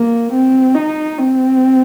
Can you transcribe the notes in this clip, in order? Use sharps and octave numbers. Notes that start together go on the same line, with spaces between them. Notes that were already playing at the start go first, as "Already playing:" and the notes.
Already playing: A#3
C4
D#4
C4